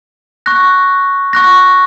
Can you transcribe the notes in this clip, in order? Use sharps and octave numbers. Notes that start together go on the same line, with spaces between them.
C#6 F#6 A#6
C#6 F#6 A#6